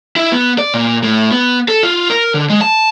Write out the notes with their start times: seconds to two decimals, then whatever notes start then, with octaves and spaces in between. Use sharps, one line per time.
0.16 E4
0.32 B3
0.58 D5
0.74 A#2
1.03 A2
1.32 B3
1.68 A4
1.83 F4
2.10 A#4
2.34 D3
2.49 G#3
2.61 A5